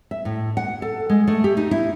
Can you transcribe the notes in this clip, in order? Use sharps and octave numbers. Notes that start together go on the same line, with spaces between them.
E5
A2
F#5
A4
G#3
A3
G4
D#4
E4